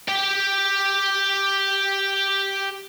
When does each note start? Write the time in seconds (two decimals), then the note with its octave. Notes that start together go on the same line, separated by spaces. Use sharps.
0.08 G4 G5